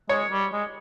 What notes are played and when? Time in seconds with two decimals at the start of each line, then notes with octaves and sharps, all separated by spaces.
0.09 G#3 C#5
0.31 G3
0.53 G#3